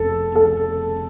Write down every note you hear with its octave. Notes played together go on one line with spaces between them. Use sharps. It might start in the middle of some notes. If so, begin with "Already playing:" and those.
Already playing: F1 A4
A4